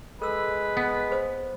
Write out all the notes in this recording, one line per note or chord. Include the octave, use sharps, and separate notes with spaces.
G#3 A4 B4 E6
B3
G#4 C5 D#6